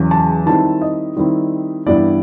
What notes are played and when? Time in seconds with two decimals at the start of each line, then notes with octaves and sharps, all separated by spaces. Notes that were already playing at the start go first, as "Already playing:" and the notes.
Already playing: E2 C#3 F#3
0.11 A5
0.46 D#3 G3 C4 E4 A5
0.82 D#5
1.17 D#3 G3 C4 E4
1.86 G2 E3 G3 B3 E4 D5